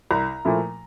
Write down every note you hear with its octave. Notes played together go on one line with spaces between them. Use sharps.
C2 A#5
A#2 F3 A3 E4